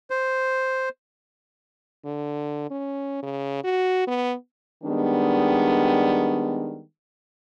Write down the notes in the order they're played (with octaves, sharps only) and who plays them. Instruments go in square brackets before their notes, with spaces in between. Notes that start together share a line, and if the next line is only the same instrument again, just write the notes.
[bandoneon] C5
[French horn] D3
C#4
C#3
F#4
B3
[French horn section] D#3 G3 G#3 B3 D4